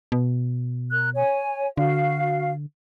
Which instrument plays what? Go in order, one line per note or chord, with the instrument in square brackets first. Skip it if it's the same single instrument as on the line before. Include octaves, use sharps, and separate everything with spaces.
[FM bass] B2
[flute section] A#4 F#6
C#5 G#5
[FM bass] D3 [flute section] F#4 F5